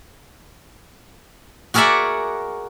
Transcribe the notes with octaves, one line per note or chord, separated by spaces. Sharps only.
F#4 G#4 A#4 D5 E5 F#5